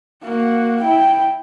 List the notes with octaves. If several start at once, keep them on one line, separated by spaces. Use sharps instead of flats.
A#3 F#4
E4 G5